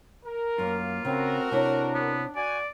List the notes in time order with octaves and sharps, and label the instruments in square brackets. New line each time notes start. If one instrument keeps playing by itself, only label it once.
[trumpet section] A#4
[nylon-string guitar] F#2 [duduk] A#3 [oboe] F4
[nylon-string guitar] C#3 [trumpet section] A3 F#4 A#4 [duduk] C4
[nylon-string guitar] C3 E4 C#5 [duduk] D4
[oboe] B3
[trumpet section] F#4 G#5 [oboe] D5